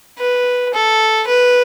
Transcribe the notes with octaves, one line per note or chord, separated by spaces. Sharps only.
B4
A4
B4